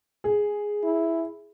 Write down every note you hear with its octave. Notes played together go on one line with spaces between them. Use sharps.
G#4
E4